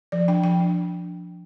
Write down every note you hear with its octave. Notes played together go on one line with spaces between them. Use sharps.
F3 D5
D4 G5
F3 G5
D4